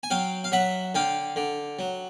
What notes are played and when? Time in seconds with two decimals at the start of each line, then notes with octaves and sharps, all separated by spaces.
0.03 G#5
0.10 F#3 F5 G5
0.44 F5
0.52 F#3 E5 F#5
0.95 D3 F5 G5
1.36 D3
1.79 F#3